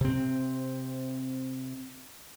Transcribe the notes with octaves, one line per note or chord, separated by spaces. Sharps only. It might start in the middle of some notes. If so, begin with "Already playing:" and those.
C3 C4